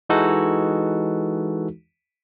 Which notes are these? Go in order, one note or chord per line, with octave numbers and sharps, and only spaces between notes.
E3 G#3 D#4 F#4 A4